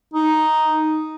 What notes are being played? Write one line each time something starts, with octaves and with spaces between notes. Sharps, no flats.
D#4